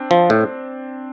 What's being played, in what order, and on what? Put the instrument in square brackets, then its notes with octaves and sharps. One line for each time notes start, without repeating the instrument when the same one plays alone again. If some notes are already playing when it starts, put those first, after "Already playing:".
Already playing: [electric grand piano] C4 D4
[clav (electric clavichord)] F3
A2